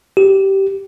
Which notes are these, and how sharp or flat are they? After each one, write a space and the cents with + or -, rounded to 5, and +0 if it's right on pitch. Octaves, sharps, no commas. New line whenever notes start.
G4 -15